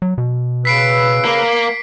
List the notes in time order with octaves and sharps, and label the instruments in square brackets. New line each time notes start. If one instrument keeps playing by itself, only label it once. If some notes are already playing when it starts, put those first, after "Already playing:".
[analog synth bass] F#3
B2
[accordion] C#3 B4 E6 [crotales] B6 C7 D7
[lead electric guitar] A#3